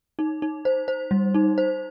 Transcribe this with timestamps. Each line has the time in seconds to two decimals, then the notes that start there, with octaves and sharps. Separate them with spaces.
0.19 D#4
0.42 D#4
0.65 C5
0.88 C5
1.11 G3
1.35 D#4
1.58 C5